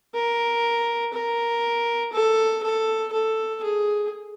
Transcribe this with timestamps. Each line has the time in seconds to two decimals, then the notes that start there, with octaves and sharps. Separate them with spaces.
0.14 A#4
1.13 A#4
2.13 A4
2.63 A4
3.12 A4
3.63 G#4